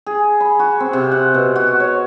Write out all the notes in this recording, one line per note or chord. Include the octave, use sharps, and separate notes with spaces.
G#4
B5
F#4
C4
C3
F#5
B2
F#4
C#5